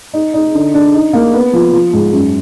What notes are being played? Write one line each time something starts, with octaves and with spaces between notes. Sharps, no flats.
D#4
D#4
D3
D4
D#4
A#3
B3
F3
F3
G#2
F#2